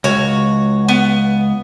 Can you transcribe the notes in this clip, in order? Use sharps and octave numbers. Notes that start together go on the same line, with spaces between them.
C#2 F#4 C#5
B3